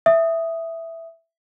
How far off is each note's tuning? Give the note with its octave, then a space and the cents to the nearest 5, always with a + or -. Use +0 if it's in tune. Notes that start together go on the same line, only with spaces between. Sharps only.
E5 +0 D#6 +0